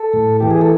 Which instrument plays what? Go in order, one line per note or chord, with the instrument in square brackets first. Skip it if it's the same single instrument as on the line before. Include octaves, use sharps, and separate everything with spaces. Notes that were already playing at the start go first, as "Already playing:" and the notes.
Already playing: [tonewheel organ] A4
A2
E3 G4
G#4
A4